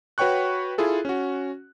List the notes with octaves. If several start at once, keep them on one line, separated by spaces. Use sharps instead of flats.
F#4 B4 C#5 G5 C#6 F#6
E4 F4 G#4 A4
C#4 F#4